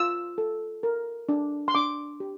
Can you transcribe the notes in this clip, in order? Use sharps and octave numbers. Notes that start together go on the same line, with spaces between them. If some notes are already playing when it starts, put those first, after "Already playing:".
Already playing: F4 E6
A4
A#4
D4
C6
D4 D6
G4